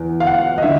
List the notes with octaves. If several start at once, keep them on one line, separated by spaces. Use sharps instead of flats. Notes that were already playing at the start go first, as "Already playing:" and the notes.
Already playing: E2
F5
F#5
D#5
D3 E5